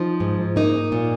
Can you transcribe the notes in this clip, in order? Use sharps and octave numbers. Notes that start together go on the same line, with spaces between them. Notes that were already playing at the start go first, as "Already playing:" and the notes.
Already playing: F3 D#4
G#2
A#3 D#4
A#2